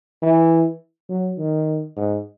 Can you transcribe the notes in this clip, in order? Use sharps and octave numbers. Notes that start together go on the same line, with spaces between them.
E3
F#3
D#3
G#2